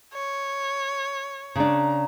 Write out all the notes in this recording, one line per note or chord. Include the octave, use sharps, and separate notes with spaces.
C#5
C#3 D4 A#5